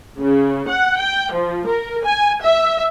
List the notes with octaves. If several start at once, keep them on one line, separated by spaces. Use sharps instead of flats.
C#3
F#5
G5
F3
A#4
G#5
E5